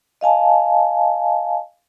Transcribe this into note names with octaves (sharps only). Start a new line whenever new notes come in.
D#5 F5 G#5 A5